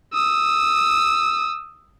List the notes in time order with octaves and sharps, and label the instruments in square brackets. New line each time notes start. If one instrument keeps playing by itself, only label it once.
[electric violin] D#6 E6